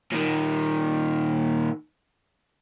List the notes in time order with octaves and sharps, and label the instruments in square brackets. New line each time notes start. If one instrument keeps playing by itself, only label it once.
[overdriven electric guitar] A#2 D#3